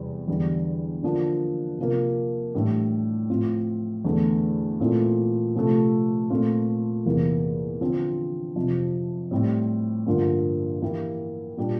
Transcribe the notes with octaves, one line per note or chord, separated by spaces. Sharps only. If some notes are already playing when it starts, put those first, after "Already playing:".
Already playing: E2 C3 G3
E2 D3 G3
D3 F3 A#3 D4
C3 F3 A#3
A2 E3 G3 D4 G4
A2 F3 C4 F4
E2 D3 A3 D4
A#2 A3 C4 E4
C3 F3 A3
A#2 A3 C4 F4
E2 C3 E3 A#3
D3 F3 C4
F2 C3 F3
A2 G3 C4
G2 D3 F3 A#3 F4
E3 A#3 E4 G4
A#2 G3 D4 G4